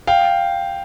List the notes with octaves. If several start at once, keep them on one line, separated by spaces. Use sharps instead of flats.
F5 G5